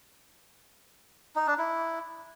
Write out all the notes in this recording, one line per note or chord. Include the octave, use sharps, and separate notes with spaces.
D#4
D4
E4